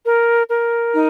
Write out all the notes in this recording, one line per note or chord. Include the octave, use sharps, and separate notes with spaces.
A#4
A#4
D#4